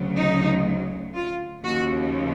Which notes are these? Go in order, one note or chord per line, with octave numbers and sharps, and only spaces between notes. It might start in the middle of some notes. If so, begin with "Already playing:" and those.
Already playing: D2 C#3 F#3
D#4
F4
D#2 C#3 F3 F#4